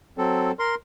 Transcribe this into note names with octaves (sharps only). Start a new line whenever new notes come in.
F#3 C4 A4
A#4 C6